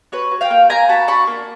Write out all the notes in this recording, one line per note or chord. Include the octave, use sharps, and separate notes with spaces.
F#4 B4 C#5
F#4
F5 G5
A#3
A#3 G#5 A#5
F#4 A5 B5
D4 B5 C#6
A#3